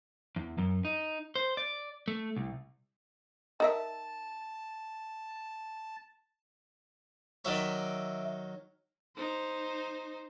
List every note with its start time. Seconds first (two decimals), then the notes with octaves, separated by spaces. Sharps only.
0.36 E2
0.58 F#2
0.85 D#4
1.36 C5
1.57 D5
2.08 A3
2.36 C2
3.60 D#4 A#4 E5 A5
7.45 D#3 F#3 C#5 D5 E5
9.17 D#4 C5